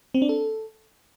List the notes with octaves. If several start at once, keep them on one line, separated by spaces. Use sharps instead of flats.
C4
D4
A4